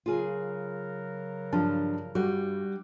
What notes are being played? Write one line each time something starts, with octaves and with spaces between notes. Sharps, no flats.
C#3 F#3 F4 G#4 A#4
G2 F3 F4 A5
G2 G3 F#4